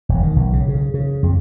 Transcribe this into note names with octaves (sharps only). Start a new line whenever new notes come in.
E1
D#3
B1
C#3
C#3
C#3
F2